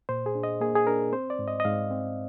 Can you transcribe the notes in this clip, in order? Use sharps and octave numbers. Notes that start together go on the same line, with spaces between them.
A#2 C5
G#4
D4
D#5
A#3 G#4
G#4
D4 A#4
C4 C5
D5
G#2
D#5
D#5
G#2 F5
C4